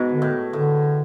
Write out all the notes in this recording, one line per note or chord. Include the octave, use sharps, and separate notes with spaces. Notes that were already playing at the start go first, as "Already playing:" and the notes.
Already playing: G#2 B2
D3
A2
A2 D3